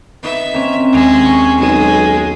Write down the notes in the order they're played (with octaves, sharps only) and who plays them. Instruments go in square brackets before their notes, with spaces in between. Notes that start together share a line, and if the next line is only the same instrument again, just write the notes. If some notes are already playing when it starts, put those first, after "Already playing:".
[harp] B3 D#4 B4 [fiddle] E5
[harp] A#3 C4 C#4
[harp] D#2 [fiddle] G#3
[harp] G#5 C#6
[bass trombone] B1 [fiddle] G#3